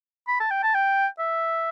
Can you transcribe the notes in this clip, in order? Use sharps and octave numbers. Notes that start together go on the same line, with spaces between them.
B5
A5
G5
A5
G5
E5